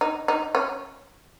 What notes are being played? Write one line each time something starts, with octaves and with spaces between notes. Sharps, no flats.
D#4
D#4
C#4